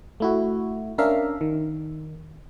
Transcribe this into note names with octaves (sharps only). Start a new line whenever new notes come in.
A3 E4 F#4
C#4 D4 A#4 E5 F5
D#3